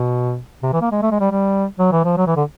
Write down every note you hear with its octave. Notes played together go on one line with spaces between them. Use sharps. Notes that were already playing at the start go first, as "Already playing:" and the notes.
Already playing: B2
C3
E3
A#3
G#3
A3
G#3
G3
G3
F#3
E3
F3
F#3
E3
D3